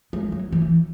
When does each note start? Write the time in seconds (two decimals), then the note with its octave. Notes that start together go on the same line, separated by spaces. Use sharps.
0.13 G#3
0.32 F#3
0.52 E3